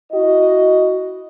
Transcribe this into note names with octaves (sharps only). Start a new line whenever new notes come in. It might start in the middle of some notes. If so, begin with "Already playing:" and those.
E4 F#4 D#5